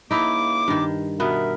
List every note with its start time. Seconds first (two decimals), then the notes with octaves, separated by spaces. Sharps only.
0.11 C#2 A#3 D#4 E4 D6
0.68 G2 D#3
1.20 B2 B3 A#4 E5